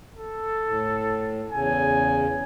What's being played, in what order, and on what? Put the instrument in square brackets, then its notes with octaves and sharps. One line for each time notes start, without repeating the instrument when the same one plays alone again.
[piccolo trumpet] A4
[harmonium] A2
[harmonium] E2 C#3 [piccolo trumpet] G#5